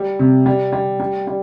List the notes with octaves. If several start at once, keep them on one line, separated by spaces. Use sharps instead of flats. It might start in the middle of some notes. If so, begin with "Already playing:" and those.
Already playing: G3
C3
G3
G3
G3
G3